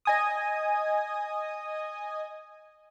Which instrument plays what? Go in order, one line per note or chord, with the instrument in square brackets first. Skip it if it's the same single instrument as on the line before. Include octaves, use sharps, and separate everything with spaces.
[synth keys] D#5 G#5 D#6